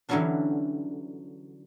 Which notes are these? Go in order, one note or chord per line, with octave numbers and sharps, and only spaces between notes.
D3 E3 F#3 G3 C#4 D4